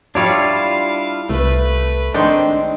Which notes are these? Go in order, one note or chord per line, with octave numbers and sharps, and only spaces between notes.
G3 D4 E4 F4 C#5 D5 F5
C2 A3 B4
D#3 G#3 C4 D4 G5